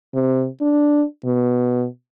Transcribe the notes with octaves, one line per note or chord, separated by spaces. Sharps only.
C3
D4
B2